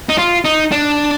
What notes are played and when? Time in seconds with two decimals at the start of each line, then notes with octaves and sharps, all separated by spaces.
0.09 D#4
0.18 F4
0.45 D#4
0.72 D4